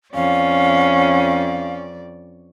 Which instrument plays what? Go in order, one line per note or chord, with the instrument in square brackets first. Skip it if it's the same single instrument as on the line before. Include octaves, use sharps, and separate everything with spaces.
[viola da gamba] F2 D5 [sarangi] C#4 [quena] F5